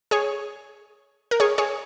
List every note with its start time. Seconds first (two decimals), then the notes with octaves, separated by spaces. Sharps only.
0.11 G#4 C#5
1.31 A#4
1.40 G#4 C#5
1.58 G#4 C#5